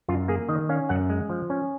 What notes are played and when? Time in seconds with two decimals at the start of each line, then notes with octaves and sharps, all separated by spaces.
0.08 F#2 F4
0.28 A#3 G#4
0.49 D#3 D#5
0.69 C#4 F5
0.89 F#2 F#5
1.10 G#3
1.30 F3
1.50 C#4